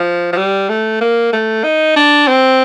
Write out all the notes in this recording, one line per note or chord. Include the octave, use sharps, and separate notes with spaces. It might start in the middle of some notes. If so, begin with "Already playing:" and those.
Already playing: F3
F3
G3
A3
A#3
A3
D#4
D4
C4